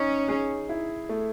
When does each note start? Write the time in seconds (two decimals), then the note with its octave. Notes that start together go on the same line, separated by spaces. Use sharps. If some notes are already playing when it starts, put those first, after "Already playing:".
Already playing: C#4 D#4
0.28 G#4
0.69 E4
1.09 A3